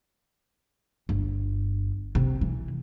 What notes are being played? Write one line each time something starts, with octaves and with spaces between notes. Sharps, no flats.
G1
C3
E3